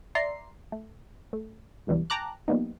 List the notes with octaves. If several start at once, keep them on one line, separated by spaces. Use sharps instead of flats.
D5 E5 A#5 C6 C7
A3
A3
G1 C#2 B2 E3 G3
G5 A5 A#5 D6 F#6
F3 G3 A#3 B3 D#4